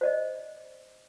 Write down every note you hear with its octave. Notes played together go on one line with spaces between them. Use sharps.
C5 D5 D#5